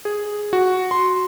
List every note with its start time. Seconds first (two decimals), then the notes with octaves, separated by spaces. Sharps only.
0.05 G#4
0.53 F#4
0.91 C6